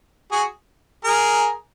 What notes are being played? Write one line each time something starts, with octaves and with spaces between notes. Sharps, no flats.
F#4 G#4
G#4 A#4